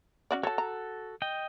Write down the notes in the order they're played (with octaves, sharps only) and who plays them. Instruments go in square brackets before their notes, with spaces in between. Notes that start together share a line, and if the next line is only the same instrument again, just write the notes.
[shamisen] C#4 F#4 D5
[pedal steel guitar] F#4 A4 [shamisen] C#5 A5
[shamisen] A#5
[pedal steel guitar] D#5 G5